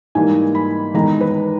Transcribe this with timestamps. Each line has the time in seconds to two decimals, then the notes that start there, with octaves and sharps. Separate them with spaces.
0.15 G#2 E3 G3 A#3 D#4 G#5
0.55 B5
0.94 E2 D#3 G#3 D#4 A#5
1.21 B4